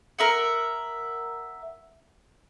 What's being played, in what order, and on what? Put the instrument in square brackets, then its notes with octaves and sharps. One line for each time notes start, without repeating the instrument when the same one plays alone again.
[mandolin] A#4 E5 F#5